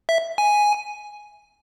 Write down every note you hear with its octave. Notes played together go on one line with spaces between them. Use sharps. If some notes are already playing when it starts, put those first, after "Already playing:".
E5
G#5